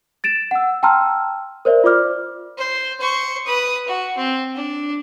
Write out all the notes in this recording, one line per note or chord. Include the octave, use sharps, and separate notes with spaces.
A6 D7 E7
F#5 E6
G5 A5 A#5 C6 E6 F6
A#4 C5 D5 E5
F4 C5 D5 D6 F6
C5
C5 C#6
B4 D#6
F#4
C4
D4